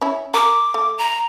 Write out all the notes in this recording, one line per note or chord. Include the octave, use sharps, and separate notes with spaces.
C#4 E4
A#4 D6
A3
A#5